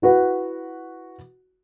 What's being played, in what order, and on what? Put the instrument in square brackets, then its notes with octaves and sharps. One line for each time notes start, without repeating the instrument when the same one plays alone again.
[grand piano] E4 F#4 B4 F#5